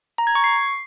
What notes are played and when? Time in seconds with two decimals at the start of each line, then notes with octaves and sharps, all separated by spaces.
0.18 A#5
0.27 G#6
0.35 C#6
0.44 C7